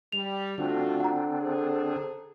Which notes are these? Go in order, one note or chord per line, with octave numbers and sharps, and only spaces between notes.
G3 F7
D3 A3 C4 D4 F4 F#4
F#5 A#5
G#4 A4 C5